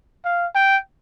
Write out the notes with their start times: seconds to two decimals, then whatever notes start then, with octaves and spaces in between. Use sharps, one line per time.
0.25 F5
0.55 G5